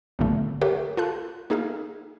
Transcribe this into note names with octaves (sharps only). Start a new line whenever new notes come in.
B1 G2 A#2 D3 A3
G4 A4 A#4 C#5 E5 F#5
F4 A4 F#6
A#3 D#4 G#4 E5 F5